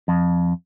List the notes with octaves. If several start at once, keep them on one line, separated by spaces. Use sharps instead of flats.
F2